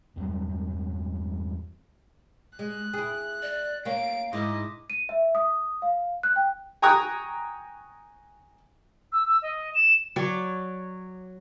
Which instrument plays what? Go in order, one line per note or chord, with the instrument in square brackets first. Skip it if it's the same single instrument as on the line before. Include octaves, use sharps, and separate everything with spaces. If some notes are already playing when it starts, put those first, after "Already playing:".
[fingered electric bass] E2 G2 F#3 G3
[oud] G#3 [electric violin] F#6
[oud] E4 G#4
[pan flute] D5
[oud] A#3 C#4 [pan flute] F5 [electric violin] D7
[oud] G#2 [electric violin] E4 D#5 [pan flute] D6
[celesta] D#7
E5
D#6
F5
F#6
G5
[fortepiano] G5 G#5 A#5 C#6 D#6 F#6
[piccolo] E6
E6
D#5
E7
[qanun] F#3 C#5 D5